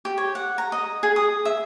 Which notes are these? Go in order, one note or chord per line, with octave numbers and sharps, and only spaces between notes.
G4
C#5
F#5
A#5
D#5
G#4
D#6
E5